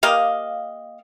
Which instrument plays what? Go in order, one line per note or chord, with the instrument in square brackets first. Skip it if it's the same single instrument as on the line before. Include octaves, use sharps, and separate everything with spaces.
[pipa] A#3 G4 D#5 F5